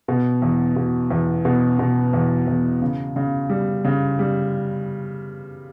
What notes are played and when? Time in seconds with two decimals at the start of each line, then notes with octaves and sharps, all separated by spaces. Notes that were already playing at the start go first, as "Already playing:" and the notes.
0.08 B2
0.42 E2
0.76 B2
1.11 E2
1.45 B2
1.79 B2
2.13 E2
2.47 E2
2.82 C#3
3.16 C#3
3.49 G3
3.85 C#3
4.19 G3